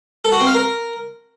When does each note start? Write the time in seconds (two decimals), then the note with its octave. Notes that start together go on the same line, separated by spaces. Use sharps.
0.25 A4
0.32 F#4
0.39 C4
0.47 F5
0.54 A#4